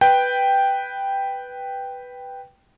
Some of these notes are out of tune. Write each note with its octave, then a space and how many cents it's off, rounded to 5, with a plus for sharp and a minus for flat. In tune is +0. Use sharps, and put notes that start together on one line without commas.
B4 +0 G5 +0